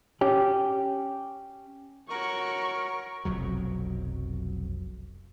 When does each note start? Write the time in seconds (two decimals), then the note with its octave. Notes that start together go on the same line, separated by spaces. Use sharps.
0.21 C#4 G4
2.09 F#4 A#4 C#5 C#6
3.25 F1 B1 F2 F#3